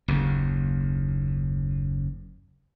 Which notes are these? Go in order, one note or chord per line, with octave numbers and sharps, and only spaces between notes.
F#1 D#2